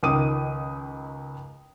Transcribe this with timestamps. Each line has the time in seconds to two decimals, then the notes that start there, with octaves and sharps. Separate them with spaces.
0.03 C#2 D#3 D6 D#6 D#7